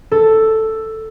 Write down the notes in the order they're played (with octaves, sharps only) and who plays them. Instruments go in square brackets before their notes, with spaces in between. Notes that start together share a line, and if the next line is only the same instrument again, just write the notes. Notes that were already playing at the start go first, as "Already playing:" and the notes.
[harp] A4